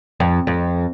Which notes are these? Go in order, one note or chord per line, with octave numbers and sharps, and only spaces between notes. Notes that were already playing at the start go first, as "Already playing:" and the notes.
F2
F2